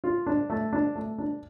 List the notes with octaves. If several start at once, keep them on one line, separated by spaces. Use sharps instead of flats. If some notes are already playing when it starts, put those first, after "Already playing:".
F4
D4
A3
D4
A3
D4